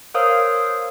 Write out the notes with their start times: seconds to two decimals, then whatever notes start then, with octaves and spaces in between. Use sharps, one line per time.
0.14 A#4 C5 C#5 F5 D#6 E6